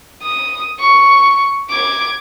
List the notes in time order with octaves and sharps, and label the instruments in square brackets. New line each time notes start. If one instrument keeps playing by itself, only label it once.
[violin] D#6
C#6
D6 G#6